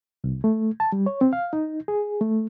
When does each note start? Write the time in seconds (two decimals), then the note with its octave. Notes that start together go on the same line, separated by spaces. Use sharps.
0.24 C2
0.44 A3
0.80 A5
0.92 G3
1.06 C#5
1.21 C4
1.33 F5
1.53 D#4
1.88 G#4
2.21 A3